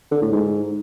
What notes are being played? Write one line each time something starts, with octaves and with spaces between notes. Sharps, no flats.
D3
A2
G#2